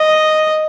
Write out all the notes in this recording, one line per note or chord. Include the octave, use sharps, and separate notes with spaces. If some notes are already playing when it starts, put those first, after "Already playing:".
Already playing: D#5